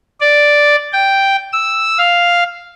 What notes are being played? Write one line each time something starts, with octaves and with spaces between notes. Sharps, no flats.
D5
G5
E6
F5